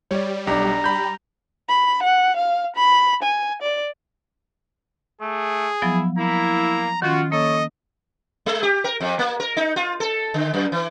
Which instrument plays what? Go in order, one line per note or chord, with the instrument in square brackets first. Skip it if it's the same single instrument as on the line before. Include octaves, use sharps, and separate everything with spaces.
[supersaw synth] G3 [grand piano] C#5 D5
[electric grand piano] B1 G4 [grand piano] D4 D5 [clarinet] A#5
[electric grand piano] B5 G6
[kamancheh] B5
F#5
F5
B5
G#5
D5
[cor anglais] A3 [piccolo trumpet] G#4
[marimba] F3 F#3 B3 [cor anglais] E4
[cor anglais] A#3 [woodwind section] E4 [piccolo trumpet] A#5
[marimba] D#3 C#4 [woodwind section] F4 [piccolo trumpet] F#4 [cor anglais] F#5
[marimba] A#3 [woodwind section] A4 [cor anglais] C#5 [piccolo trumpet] D#5
[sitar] G#3
G4
A#4
F2
A#3
A#4
D#4
F4
A4
D3
F#2
E3